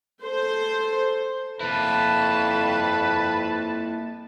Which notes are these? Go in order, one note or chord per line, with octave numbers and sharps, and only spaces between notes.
A4 C5
F2 A#3 E4 B4 A5